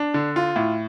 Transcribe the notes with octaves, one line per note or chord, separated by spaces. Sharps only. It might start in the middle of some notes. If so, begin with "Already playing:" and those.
Already playing: D4
D3
F4
A2